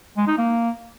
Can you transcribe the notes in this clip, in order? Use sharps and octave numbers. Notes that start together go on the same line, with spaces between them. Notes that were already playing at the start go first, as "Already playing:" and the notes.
G#3
D#4
A#3